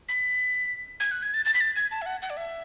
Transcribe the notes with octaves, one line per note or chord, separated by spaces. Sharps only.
B6
G#6
F#6
G#6
A6
A6
B6
A6
G#6
A5
E5
F#5
F#5
D5
E5